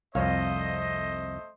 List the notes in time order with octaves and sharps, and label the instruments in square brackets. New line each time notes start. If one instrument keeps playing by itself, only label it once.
[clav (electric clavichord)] C2 F2 [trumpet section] A3 C5 D#5 [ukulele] C#5 F5